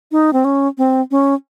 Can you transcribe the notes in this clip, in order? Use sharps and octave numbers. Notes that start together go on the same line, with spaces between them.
D#4
C4
C#4
C4
C#4